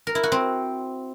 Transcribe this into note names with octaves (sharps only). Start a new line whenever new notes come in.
A#4
E4
F#4
C4